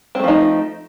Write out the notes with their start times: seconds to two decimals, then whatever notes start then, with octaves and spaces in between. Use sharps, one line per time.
0.15 C4
0.19 A3
0.24 F3
0.28 D#4